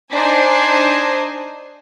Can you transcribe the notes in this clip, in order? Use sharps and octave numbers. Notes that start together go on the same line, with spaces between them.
D4 D#4 C5 G#5